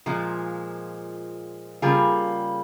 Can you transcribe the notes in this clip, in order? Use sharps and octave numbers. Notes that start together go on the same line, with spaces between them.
A#2 F3 G#3
C#3 G3 A#3 F4 G#4